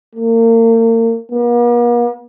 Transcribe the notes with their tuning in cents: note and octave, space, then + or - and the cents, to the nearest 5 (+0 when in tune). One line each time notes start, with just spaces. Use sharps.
A#3 -35
A#3 +45